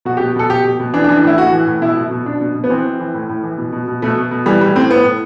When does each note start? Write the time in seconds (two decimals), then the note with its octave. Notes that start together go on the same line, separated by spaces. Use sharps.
0.05 B2 F#4
0.17 G4
0.20 B2
0.36 B2 A4
0.50 B2 G4
0.65 B2
0.80 B2
0.94 E3 D4
1.04 D4
1.08 E3
1.16 D4
1.23 A2 E4
1.37 A2 F#4
1.52 E3
1.67 A2
1.81 B2 E4
1.97 B2
2.11 B2
2.26 B2 D4
2.41 B2
2.55 B2
2.64 B3
2.69 E3 C4
2.85 E3
3.00 E3
3.14 A2
3.29 A2
3.43 E3
3.58 B2
3.72 B2
3.88 B2
4.02 B2 A3
4.17 B2
4.31 B2
4.46 E3 G3
4.61 A2 G3
4.75 A2 C4
4.91 A2 B3
5.05 A2